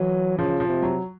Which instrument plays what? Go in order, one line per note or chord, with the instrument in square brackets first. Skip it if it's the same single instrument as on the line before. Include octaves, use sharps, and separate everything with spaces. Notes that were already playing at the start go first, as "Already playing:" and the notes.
Already playing: [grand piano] E3 [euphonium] F#3
[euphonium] C#3 [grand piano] F3
[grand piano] F3
[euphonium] C3
[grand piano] F#3